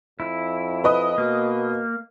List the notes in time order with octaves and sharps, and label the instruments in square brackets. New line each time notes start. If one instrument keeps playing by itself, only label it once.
[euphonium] F2 [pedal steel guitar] E4
[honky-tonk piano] B4 D#5 D#6
[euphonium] B2 [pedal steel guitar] A#3